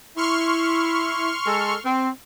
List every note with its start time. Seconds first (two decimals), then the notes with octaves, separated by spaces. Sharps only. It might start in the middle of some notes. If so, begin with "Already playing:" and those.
0.16 E4 C6 C#6 F6
1.46 G#3 A4
1.84 C4